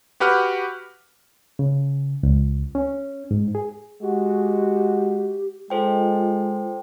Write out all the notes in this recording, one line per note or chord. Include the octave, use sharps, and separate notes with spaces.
F#4 G4 B4 F#5 F6
C#3
C#2
C#4
G#2
G#4
G#3 F#4 G4
G#3 F4 A4 C5 G5